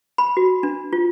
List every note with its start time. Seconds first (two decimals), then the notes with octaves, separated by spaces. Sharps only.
0.18 B5
0.37 F#4
0.63 D4
0.93 F4